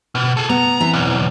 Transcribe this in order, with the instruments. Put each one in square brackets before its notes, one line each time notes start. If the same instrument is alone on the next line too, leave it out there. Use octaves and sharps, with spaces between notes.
[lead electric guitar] B2
G#4 A4
[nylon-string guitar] B3 [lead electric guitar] A#5
[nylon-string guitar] E3 C4
[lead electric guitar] B1 E2